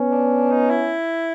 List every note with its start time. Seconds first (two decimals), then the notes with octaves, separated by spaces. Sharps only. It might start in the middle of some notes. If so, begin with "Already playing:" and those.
Already playing: B3 C#4
0.12 D4
0.51 D#4
0.70 E4